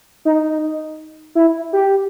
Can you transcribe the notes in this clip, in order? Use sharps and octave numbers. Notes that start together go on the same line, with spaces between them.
D#4
E4
G4